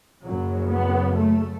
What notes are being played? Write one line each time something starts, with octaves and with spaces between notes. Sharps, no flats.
F#1 F#2 C#3 F#3
B3
A3